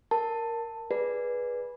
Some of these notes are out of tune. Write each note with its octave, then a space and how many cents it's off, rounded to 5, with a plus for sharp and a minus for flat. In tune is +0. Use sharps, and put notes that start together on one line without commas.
A#4 +0 A5 +15
G#4 +0 B4 -15 D5 +0